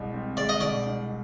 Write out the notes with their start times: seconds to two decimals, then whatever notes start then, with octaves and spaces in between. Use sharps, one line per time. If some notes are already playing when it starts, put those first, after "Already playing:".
Already playing: C2 B2 G#3
0.13 C4
0.37 G#3 D5
0.49 D#5
0.61 B2 D5
0.86 C2